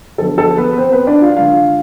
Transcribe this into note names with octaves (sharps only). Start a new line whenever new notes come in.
D3 F3 B3 A4
A4
B3 B4
C4 C5
B3 B4
D4 D5
F4 F5
D3 G#3 D4 F4 F5